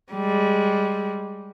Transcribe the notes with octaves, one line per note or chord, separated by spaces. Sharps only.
G3 G#3